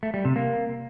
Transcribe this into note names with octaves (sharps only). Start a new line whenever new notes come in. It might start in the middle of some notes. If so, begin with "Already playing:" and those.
A3
G3
C3
A#3